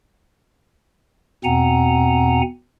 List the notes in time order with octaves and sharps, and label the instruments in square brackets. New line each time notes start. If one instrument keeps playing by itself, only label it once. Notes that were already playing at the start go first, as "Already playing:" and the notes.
[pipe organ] E2 B2 C4 F#5 G#5 A#5